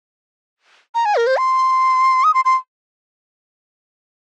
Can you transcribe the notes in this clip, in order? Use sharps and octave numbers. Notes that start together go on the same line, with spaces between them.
A#5
G#5
A#4
C5
C6
D#6
C6
C6